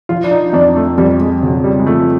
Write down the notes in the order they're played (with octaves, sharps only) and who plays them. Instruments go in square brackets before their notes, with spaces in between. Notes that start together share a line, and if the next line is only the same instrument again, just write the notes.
[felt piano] F3 [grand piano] F4
[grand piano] D4
D#4
D#4
[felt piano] F2 [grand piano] D4
[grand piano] A3
[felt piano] F2 [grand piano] G3
[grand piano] G#3
[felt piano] C#3 [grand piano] F#3
[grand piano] G3
G#3
[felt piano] F3 [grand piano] A3